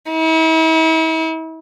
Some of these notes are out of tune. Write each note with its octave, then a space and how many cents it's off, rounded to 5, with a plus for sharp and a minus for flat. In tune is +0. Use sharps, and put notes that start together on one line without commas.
E4 -40